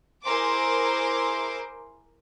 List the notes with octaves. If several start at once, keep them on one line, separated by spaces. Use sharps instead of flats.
E4 G#4 A#4 C5 C6 D6